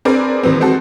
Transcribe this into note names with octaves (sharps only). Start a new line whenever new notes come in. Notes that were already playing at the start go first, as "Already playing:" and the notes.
C4 D4 G#4 A#4 B4 D5
D#2 E3 B3 C4
G#3 C4 F#4 A4